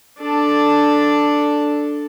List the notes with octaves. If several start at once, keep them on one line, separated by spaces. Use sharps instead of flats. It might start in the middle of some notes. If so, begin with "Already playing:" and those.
D4 A4